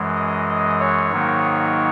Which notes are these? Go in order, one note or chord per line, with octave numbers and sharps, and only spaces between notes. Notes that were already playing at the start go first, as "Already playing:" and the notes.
Already playing: F#2 E3 G#3
D#5
D#5
C#5
G#2 D#3 F#3 A#3 D#4